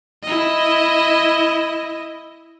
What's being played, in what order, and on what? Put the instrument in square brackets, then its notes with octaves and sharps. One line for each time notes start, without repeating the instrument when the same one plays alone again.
[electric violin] E4 D#5